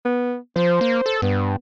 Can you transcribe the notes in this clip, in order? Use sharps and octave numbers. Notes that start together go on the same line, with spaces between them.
B3
F3 C5
A#3
A4
G2 B3